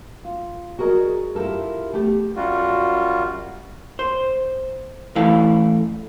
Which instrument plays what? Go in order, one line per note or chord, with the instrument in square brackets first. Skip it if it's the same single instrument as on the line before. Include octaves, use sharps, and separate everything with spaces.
[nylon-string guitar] F4
F#4 G#4 A#4 D5 D#5
E4 F4 G4 A4 A#4
A3 B3 G4
[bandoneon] F#2 G3 F4 F#4
[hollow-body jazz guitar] C5
A2 E3 A3 E4 F5